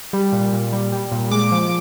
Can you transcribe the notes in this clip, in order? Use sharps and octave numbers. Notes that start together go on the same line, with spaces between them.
G3
A#2
A#2
G3
G3
A#2
G#3 D6
F3